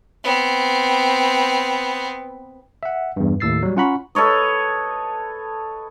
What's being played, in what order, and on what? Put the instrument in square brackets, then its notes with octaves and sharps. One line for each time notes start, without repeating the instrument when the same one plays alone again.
[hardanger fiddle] B3 C4
[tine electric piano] E5 F#5
E2 G2
D#2 A2 E6 A6 C7
F#3 G3
C#4 F4 F#5 A#5 B5 C#6
[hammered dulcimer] A4 B4 C#5 D#5